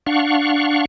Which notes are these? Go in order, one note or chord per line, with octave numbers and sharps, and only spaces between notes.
D4 F5 F#5 C#6